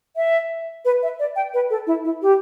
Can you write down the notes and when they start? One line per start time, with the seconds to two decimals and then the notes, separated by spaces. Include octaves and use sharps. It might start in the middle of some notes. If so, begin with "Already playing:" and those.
0.16 E5
0.85 B4
1.03 E5
1.19 D5
1.36 G5
1.54 B4
1.70 A4
1.87 E4
2.04 E4
2.22 G4